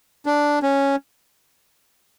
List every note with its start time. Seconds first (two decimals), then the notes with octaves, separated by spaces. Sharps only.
0.26 D4
0.63 C#4